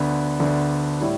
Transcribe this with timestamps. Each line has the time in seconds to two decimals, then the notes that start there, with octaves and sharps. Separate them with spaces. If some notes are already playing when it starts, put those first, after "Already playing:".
Already playing: D2 D3 B3 D4
0.40 D2 D3 B3 D4
0.99 A2 G3 E4